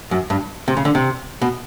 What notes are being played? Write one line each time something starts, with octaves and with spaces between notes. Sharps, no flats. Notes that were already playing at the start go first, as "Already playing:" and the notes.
F#2
G2
C3
C#3
D3
C3
B2